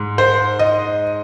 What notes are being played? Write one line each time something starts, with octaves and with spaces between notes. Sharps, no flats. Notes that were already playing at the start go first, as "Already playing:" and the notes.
Already playing: G#2
C5
D#5